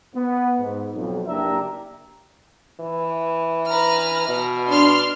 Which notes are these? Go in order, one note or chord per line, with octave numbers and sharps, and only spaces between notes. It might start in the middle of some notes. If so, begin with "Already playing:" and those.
B3
G#2
B1 F2
F#1 A#3 D4 G4 E5 A#5
E3
B4 A#5 F6
B2
D4 C6 F6